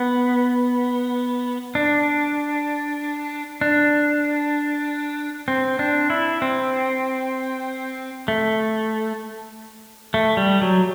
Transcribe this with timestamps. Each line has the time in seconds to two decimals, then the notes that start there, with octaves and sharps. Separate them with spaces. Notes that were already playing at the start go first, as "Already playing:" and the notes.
Already playing: B3
1.75 D4
3.61 D4
5.48 C4
5.79 D4
6.10 E4
6.42 C4
8.28 A3
10.14 A3
10.37 G3
10.62 F#3